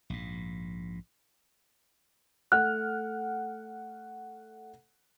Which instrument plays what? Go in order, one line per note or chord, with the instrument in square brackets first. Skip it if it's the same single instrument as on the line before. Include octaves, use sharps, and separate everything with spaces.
[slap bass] A#1 G#2
[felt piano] A3 F#5 F6 [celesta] F#6